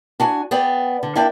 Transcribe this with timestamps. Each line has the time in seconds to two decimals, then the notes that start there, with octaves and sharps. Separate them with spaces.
0.20 D4 F#4 G#5
0.51 B3 G#4 D5 G5
1.03 D3
1.16 A#3 D4 E4 D5 G5